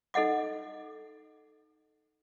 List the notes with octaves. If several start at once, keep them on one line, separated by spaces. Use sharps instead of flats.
D#4 A4 D#5 F#5 D6